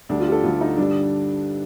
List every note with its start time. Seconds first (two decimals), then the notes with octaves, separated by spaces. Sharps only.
0.09 D2 D3 G3 D4
0.20 F4
0.28 G4
0.32 A4
0.44 D2 D3 G3 F4
0.61 D#4
0.77 G2 D3 G3 D4